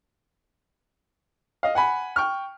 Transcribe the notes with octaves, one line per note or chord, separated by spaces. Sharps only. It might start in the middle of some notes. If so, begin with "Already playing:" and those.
D#5 F5
F#5 G#5 B5
G5 C#6 F6